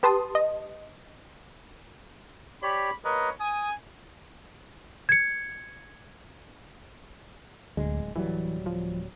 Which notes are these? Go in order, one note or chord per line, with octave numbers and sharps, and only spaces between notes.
G4 B4 A5 C6 D#6
D#5
G4 C#5 D5 B5
A#3 G4 A#4 B4 C#5 D#5
G#5 D#6
G#6 C#7
D1 D2 G#3
D1 E3 F#3 G3
F3